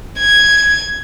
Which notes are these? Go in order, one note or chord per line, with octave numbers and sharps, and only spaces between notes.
G#6